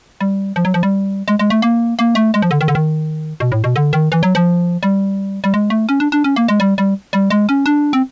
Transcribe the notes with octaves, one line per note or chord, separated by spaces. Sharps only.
G3
F3
F#3
F3
G3
G#3
G#3
A3
A#3
A#3
A3
G#3
F3
D3
D#3
D3
D#3
B2
A2
B2
D3
D#3
E3
F#3
F3
G3
G3
G#3
A3
C#4
D4
D4
C#4
A#3
G#3
G3
G3
G3
G#3
C#4
D4
C4